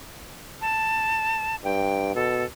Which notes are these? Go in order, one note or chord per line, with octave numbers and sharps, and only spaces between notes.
A5
G2 G5
B2 A4